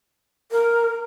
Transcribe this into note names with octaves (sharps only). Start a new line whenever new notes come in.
A#4